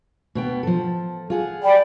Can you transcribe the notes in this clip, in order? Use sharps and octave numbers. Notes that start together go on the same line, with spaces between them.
B2 B3 G5
F3 A4
F4 G#4 F#5
D5 G5 B5